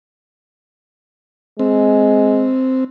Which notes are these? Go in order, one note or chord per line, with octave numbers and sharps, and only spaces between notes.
G#3 C4